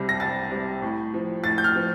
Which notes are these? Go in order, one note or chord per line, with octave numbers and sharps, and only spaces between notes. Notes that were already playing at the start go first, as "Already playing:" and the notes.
Already playing: C2 C3 G3
A#6
C2 A6
C3 G3
A2
F3
A2 A6
G6
F6
F3